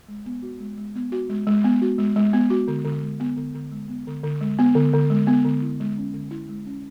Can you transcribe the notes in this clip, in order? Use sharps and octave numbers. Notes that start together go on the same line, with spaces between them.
G#3
B3
F#4
G#3
G#3
B3
F#4
G#3
G#3
B3
F#4
G#3
G#3
B3
F#4
D3
D3
G#3
B3
D3
D3
G#3
B3
D3
D3
G#3
B3
D3
D3
G#3
B3
D3
E4
G#3
C#4
D3
E4
G#3
C#4